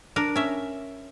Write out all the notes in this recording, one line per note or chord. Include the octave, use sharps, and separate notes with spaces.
D4 A#4
C#4 E5